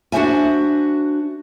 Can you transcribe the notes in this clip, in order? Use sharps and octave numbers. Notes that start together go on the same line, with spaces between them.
D4 F#4 G4 C5 E5 G#5